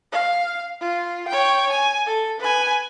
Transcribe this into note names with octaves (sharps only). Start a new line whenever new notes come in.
F5
F4
C#5 G5
G#5
A4
B4 G#5